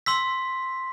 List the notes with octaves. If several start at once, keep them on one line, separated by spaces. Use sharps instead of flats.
C6 E6 B6